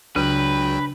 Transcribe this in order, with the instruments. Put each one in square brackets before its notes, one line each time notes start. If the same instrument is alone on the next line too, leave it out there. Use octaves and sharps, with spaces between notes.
[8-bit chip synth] C#2 F#3 G5 [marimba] C#3 [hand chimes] D4 [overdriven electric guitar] B4